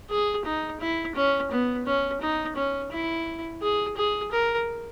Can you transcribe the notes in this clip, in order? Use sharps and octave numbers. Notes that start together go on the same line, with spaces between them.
G#4
D#4
E4
C#4
B3
C#4
D#4
C#4
E4
G#4
G#4
A#4